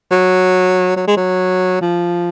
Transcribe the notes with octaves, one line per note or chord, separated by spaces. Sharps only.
F#3
F#3
G#3
F#3
F3